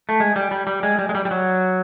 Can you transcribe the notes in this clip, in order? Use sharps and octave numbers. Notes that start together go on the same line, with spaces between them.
A3
G#3
G3
G3
G3
G#3
G3
G#3
G3
G3
F#3